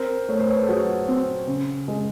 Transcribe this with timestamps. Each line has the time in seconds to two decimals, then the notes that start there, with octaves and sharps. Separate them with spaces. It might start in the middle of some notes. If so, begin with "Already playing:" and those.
Already playing: C4 A#4 C5
0.28 A3 C#5
0.40 C5
0.50 B4 C#5
0.62 A4
0.68 F#3 F#4 G#4
1.08 C4
1.47 C#3
1.88 G#3